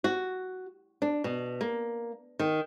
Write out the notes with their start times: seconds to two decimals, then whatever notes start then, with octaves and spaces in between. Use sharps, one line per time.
0.04 F#4
1.02 D4
1.24 B2
1.61 A#3
2.39 D#3